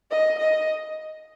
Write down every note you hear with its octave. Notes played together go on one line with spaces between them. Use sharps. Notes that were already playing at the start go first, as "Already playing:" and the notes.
D#5
D#5